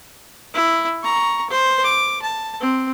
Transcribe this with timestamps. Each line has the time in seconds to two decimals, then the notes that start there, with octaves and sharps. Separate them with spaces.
0.54 E4
1.03 A#5 C#6
1.50 C5
1.83 D6
2.22 A5
2.60 C4